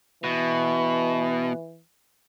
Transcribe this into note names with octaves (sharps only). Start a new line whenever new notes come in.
B2 E3